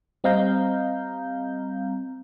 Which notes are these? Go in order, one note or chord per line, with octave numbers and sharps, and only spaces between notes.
G3 C4 D#5 F5 A#5 G6